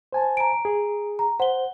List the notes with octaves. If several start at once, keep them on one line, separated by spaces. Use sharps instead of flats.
C5 G#5 A5
A#5 D7
G#4
A#5
C5 F#5 G7